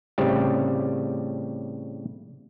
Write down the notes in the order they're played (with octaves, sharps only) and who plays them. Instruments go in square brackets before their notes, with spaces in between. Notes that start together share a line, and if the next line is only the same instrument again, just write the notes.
[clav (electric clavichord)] A2 C#3 G3 C4 G4